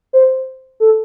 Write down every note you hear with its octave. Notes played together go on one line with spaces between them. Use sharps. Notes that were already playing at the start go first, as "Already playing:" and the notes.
C5
A4